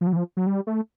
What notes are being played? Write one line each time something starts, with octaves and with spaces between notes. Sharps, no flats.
F3
F#3
E3
F3
F#3
G3
A3